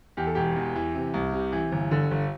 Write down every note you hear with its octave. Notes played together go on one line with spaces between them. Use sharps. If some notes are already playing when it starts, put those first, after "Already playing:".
E2 G4
A4
E1 G4
E2
E3
C3
C2
C3
E3
G1
D3
G1